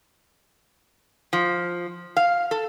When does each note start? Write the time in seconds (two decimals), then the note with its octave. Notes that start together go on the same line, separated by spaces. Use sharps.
1.33 F3
2.16 F5
2.51 A4